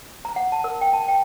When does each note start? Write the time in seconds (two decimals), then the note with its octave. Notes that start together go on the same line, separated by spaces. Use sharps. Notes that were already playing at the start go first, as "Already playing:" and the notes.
0.25 A#5
0.36 F#5
0.52 A5
0.64 A#4
0.81 G5
0.93 A5
1.08 G5